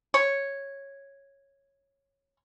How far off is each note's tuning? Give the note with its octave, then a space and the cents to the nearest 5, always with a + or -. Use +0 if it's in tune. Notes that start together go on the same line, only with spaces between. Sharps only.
C#5 -5